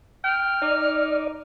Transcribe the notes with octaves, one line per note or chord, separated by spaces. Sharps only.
G5 F6
D#4 D5